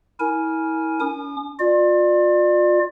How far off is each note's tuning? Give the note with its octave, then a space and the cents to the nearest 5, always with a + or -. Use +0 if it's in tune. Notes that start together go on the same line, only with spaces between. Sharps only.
E4 -35 A#4 +0 G#5 +10
C#4 +40 D#6 -45
F4 +30 D5 +25